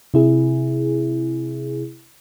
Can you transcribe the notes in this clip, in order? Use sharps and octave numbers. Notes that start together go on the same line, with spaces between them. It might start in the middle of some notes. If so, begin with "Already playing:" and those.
C3 E4 G#4